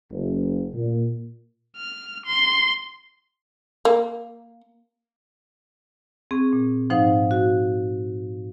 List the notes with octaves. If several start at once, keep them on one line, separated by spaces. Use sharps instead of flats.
F#1
A#2
F6
C6
A#3
C4 G#4 C#6
A#2
G#2 F3 D#4 C5 F5 F#5
F#4